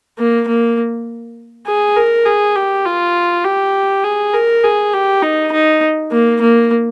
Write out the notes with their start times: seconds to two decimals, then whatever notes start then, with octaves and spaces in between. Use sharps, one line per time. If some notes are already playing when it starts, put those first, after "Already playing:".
0.18 A#3
0.48 A#3
1.67 G#4
1.97 A#4
2.25 G#4
2.56 G4
2.86 F4
3.45 G4
4.04 G#4
4.34 A#4
4.64 G#4
4.94 G4
5.22 D#4
5.52 D#4
6.12 A#3
6.41 A#3